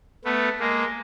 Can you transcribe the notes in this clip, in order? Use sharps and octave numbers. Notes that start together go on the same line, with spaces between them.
A3 B3
G#3 A#3